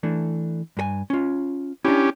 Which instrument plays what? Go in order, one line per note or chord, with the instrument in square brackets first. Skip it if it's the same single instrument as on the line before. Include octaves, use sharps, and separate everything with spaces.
[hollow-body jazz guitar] E3 A3 D4
G2 G#4 G#5
C#4 F4
[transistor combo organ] C#4 G4 [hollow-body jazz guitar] D4 E4